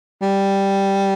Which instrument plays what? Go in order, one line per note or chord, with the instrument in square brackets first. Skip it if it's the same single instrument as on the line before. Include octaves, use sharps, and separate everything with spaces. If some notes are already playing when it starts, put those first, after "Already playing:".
[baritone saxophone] G3